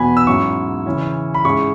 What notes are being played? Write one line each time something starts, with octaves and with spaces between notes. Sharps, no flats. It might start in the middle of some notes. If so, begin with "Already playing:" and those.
Already playing: E2 B2 B3 G#5 B5
E6
G#2 F#3 C#4 E4 C#6
C#3 E3 C#4 E4
B5
G#2 G#3 C#4 E4 C#6